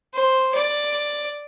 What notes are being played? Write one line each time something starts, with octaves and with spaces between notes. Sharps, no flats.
C5
D5